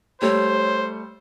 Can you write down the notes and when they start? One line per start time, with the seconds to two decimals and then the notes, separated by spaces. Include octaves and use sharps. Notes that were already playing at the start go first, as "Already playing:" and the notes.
0.22 G3 A3 A4 C5 C#5